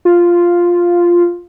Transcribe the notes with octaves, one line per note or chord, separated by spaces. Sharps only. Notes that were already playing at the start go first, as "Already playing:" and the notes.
F4